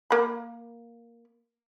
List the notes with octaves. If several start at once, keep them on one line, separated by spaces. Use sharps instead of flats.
A#3 B5